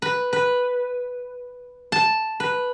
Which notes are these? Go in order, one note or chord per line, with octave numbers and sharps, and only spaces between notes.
B4
B4
A5
B4